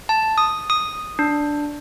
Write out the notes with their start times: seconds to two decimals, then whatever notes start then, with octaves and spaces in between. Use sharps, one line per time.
0.09 A5
0.38 D#6
0.70 D#6
1.19 D4